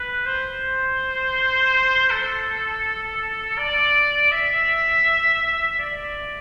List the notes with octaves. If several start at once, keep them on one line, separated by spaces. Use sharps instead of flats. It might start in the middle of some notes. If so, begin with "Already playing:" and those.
Already playing: B4
C5
A4
D5
E5
D5